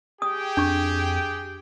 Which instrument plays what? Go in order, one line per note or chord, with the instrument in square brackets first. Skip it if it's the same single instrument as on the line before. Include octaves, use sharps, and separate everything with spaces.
[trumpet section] G4 G#4 G5 [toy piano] D#6
[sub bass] F2 [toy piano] D4 C#6